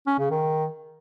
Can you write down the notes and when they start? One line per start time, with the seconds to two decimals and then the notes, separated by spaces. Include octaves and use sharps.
0.07 C#4
0.19 C#3
0.31 D#3